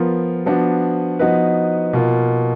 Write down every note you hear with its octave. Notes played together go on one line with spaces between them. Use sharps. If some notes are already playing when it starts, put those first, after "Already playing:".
Already playing: F3 B3 F4 A#4
F3 B3 D4 F#4
F3 B3 D#4 F#4 B4
B2 A#3 F4